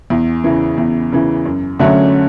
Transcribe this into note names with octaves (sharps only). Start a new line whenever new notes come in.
E2
C#3 E3
E2
C#3 E3
F#2
D3 F#3 A3 C#4